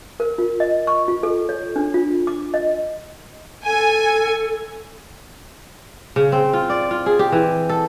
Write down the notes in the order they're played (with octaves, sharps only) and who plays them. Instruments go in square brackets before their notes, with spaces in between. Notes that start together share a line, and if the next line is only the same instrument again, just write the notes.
[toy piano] A#4
F4
D#5
C#6
F4
A4
C#5
D4
F4
D6
D#5
[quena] A4 [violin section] G#5
[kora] C#3
C4
F4
D5
F4
G#4
G4
E3
A4